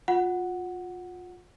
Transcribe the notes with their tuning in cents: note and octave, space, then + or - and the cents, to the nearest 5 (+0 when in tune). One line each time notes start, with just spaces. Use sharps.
F4 +30 F#5 +0